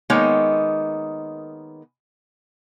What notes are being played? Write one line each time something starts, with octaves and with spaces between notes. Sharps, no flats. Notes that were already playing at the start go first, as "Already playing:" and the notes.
D#3 G#3 A#3 B3 D#4 C#5